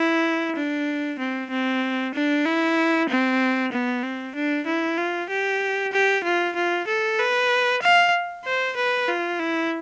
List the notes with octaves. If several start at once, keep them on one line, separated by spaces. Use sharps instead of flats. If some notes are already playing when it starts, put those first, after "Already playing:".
Already playing: E4
D4
C4
C4
D4
E4
C4
B3
C4
D4
E4
F4
G4
G4
F4
F4
A4
B4
F5
C5
B4
F4
E4